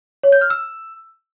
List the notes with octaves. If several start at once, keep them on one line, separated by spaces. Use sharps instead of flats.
C#5
G6
F6
E6